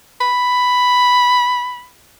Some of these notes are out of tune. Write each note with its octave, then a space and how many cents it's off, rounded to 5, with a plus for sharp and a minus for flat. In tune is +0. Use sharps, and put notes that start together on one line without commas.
B5 +5